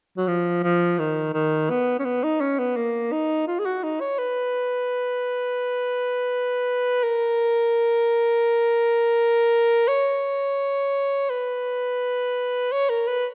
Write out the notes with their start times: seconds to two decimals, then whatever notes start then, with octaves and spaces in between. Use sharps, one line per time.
0.18 F#3
0.28 F3
0.63 F3
0.99 D#3
1.34 D#3
1.70 B3
1.99 C#4
2.05 B3
2.24 D#4
2.41 C#4
2.59 B3
2.77 A#3
3.12 D#4
3.48 F4
3.59 G#4
3.65 F#4
3.83 D#4
4.00 C#5
4.19 B4
7.04 A#4
9.88 C#5
11.30 B4
12.72 C#5
12.90 A#4
13.08 B4